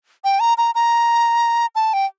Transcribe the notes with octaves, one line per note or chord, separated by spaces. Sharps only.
G5
A#5
A#5
A#5
A5
G5